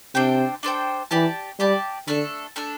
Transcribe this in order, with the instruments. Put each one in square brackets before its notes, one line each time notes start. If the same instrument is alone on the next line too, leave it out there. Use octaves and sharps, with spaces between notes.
[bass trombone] C3 [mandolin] D4 A4 C5 G5
[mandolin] D4 A4 C5 G5
[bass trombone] E3 [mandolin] G4 D5 A5
[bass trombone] G3 [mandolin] G4 D5 A5
[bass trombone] D3 [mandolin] A3 D4 A4
[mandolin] A3 D4 A4